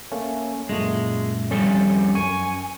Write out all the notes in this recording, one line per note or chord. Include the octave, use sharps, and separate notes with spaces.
A3 A#3 C#4
F#2 A#2 G#3 A3
F2 G3 C#4 A4
F#2 G#5 C#6